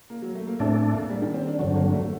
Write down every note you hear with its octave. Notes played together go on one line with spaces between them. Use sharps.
A#3
F#3
A3
A#3
A2 A3 C4 D4
A#3
G3
D#3
C4
D4
G2 D3 F#3 C4
A#3
A3